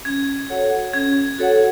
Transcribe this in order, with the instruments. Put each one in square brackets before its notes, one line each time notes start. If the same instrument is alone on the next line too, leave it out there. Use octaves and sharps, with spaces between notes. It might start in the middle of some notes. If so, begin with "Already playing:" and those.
[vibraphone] C#4 [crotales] G#6
[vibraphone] F#4 A4 C#5 F#5
[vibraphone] C#4 [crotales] G#6
[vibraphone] F#4 A4 C#5 F#5